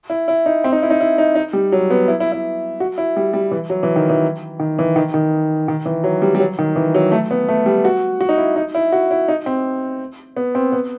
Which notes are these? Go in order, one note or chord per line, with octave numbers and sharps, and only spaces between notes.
E4
E4
D#4
C4
D#4
E4
D#4
E4
D#4
D#4
G3
F#3
B3
E4
E4
E4
F#4
E4
G3
G3
E3
F#3
E3
D#3
E3
D#3
E3
D#3
D#3
D#3
E3
F#3
G3
G3
F#3
D#3
E3
F#3
A3
B3
A3
G3
F#4
F#4
D#4
E4
D#4
E4
F#4
E4
D#4
C4
B3
C4
B3